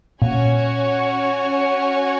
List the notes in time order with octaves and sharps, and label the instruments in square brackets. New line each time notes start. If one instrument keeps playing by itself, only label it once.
[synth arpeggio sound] A#2 [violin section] C#4 F#4 C#5 G#5